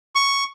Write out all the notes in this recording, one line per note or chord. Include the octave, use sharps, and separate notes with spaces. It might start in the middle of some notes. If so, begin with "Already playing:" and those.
C#6